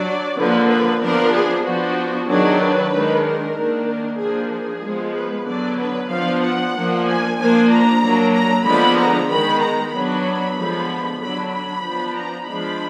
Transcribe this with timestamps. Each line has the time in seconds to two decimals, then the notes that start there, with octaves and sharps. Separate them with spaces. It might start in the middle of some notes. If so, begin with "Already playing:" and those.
Already playing: F#3 D4 D5
0.38 D3 F3 A#3 B4
0.70 B4
1.01 F3 B3 D4 A#4
1.33 G#4
1.66 F3 B3 D4 F#4
2.29 D#3 F#3 D4 G#4
2.61 B4
2.92 D#3 G#3 D4
3.24 A#4
3.56 D#3 A#3 D4
3.89 A#4
4.19 F3 A#3 D4 G#4
4.51 G#4
4.84 F3 G#3 B3
5.15 B4
5.47 D3 F#3 B3 D4 D5
5.79 B4
6.10 F3 B3 D4 F5
6.42 F#5
6.74 F3 A#3 D4
7.07 G#5
7.38 F3 A#3 D4 G#5
7.70 A#5
8.02 F#3 A#3 D4
8.34 A#5
8.65 D3 F3 G#3 B3 D4 B5
8.97 A#5
9.29 D#3 G#3 B3 B5
9.61 A#5
9.92 F#3 B3 D4 B5
10.56 D3 F3 G#3 B3
11.19 D3 F#3 D4 B5
11.51 B5
11.84 F3 B3 D4
12.16 A#5
12.47 F3 G#3 D4 B5